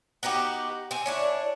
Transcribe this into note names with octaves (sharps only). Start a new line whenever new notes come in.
B3 D#4 F#4 G4
C4 G#5
D4 E4 C#5